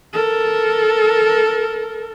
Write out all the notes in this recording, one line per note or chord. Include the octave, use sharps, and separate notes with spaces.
A4 A#4